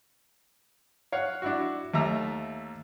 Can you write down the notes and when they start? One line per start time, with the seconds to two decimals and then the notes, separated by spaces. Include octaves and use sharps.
1.12 C#5 F5 F#5
1.42 D4 E4 F#4
1.94 D#2 A3 E5 A#5 E6